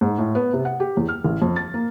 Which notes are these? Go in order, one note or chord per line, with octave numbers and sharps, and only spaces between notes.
G#2
A2
B3
C3
F#5
G4
E2
F6
A1
F2
A6
A#3